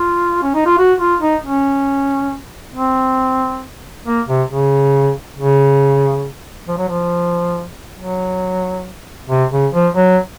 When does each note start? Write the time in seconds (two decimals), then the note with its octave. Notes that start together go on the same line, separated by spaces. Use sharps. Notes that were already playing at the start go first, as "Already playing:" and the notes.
Already playing: F4
0.42 C#4
0.55 D#4
0.66 F4
0.78 F#4
1.00 F4
1.21 D#4
1.44 C#4
2.75 C4
4.06 A#3
4.28 C3
4.49 C#3
5.36 C#3
6.68 F3
6.78 F#3
6.89 F3
7.99 F#3
9.30 C3
9.52 C#3
9.73 F3
9.95 F#3